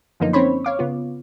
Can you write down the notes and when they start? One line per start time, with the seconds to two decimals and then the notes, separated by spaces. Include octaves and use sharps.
0.20 F#2 D3 F3 A#3 B3 D#4
0.33 C4 C#4 C5 C#5 B5
0.65 C#5 F5 D6
0.79 C#3 B3 F4